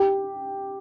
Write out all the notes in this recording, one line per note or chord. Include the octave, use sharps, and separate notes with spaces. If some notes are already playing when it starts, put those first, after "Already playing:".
Already playing: G4